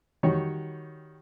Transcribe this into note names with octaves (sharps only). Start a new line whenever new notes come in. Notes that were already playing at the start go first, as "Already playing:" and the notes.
D#3 G3 F#4 C#5